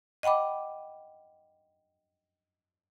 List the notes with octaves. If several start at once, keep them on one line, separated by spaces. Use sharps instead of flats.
D#5 F#5 G5 B5 D6